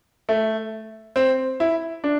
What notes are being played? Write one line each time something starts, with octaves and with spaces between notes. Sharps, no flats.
A3
C4
E4
D4